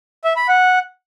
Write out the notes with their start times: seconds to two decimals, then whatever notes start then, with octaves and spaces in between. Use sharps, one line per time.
0.24 E5
0.36 B5
0.48 F#5